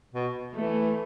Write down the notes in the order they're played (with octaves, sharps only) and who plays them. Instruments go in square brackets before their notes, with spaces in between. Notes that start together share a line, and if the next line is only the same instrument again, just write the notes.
[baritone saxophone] B2
[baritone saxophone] E3 [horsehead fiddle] A3